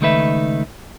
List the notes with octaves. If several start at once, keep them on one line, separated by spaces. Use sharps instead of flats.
C#2 D#3 A3 D#4 B4 E5